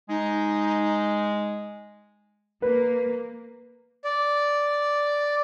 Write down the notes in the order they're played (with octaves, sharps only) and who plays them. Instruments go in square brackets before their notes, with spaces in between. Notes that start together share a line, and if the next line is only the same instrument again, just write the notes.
[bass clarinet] G#3 [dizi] D#4
[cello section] A#3 [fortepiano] B4
[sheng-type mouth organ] D5